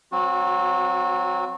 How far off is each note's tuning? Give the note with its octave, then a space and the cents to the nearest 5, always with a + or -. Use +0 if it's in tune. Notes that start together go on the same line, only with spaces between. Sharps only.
F#3 +0 C4 +0 F#4 -30